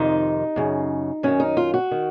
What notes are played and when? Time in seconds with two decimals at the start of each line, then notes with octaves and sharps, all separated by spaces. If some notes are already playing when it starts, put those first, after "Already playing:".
Already playing: F2 C3 D#3 D#4
0.56 F#2 C#3
1.23 F#2 D#3 C#4
1.40 D#4
1.57 F4
1.74 F#4
1.91 D#3